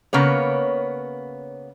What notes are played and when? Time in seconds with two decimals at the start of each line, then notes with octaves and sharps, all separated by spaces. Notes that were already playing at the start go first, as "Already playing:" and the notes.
0.13 C#3 A#3 B3 C#5